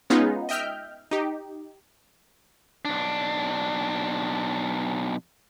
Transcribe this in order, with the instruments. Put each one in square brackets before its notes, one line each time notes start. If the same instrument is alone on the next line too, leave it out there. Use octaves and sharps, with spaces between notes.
[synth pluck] G#3 B3 C#4 D#4 F4 G#4
D#5 E5 G5 F6 G6
D#4 G4
[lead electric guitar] B1 D4